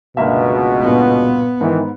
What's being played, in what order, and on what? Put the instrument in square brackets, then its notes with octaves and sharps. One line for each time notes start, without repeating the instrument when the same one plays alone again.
[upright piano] G1 A#3 E5 [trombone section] C#2 B2
[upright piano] G2 A#2 [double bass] B3
[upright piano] G#2 B3 [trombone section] D#3 E3